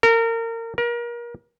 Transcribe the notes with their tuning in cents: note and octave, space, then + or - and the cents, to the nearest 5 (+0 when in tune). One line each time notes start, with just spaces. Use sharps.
A#4 -30
A#4 +30